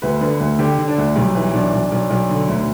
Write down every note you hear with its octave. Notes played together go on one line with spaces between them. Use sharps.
D2 B4
D3 B4
D2
D3 G4
D3
D4
D2
B1 G3
E3 G3
B1 D4
B1
B1
B1
D3
D2